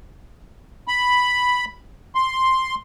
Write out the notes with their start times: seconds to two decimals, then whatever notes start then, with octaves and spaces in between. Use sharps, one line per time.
0.88 B5
2.15 C6